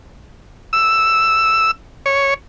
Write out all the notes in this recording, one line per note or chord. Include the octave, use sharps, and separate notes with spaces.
E6
C#5